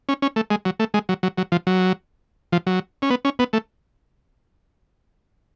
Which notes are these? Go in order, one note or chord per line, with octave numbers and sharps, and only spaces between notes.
C#4
C#4
A3
G#3
F#3
A3
G#3
F#3
F#3
F#3
F3
F#3
F3
F#3
C#4
B3
C#4
B3
A3